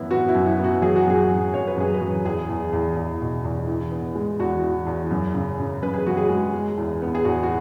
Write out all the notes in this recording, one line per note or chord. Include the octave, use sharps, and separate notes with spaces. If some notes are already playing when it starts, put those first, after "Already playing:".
Already playing: F#2 E3 B3 E4
B3 F#4
E4
F#2
E4
B3 F#4
F#3 G#4
F#4
F#2 G#4
F#2
F#2 C#5
B4
F#2 G#4
B4
F#3
E2 G#4
E2
E2
E2
B2
E2
E3
B3
G#3
E2 F#4
E3
E2
F#2
C#3
C#3
F#2 B4
G#4
F#2 F#4
G#4
G#3
G#3
E2
B3
G#4
E2 F#4
F#4